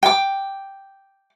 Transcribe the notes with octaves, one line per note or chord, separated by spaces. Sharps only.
G5 D6